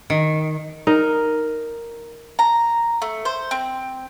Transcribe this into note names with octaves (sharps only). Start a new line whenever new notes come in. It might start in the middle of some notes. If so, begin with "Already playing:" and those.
D#3
D#4 A#4
A#5
A3
C5
C4